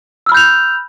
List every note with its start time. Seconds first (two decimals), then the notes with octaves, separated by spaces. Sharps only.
0.26 E6
0.29 F6
0.32 B5
0.34 G6
0.37 F7